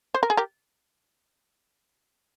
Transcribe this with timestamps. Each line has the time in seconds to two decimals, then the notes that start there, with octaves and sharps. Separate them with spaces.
0.14 C5
0.23 A#4
0.30 G#4
0.37 G4 A#4